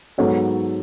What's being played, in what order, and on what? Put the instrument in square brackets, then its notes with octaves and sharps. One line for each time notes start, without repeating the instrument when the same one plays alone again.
[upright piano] G#2 F#3 B3 A4 C#5